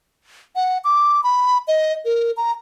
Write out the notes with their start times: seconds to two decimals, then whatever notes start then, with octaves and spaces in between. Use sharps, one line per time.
0.56 F#5
0.84 D6
1.24 B5
1.68 D#5
2.05 A#4
2.37 A#5